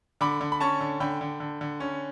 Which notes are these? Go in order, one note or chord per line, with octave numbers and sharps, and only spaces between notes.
D3 B5 D6
D3
B5
C#4 A5 C#6
D3
D3 G5 B5
D3
D3
D3
C#4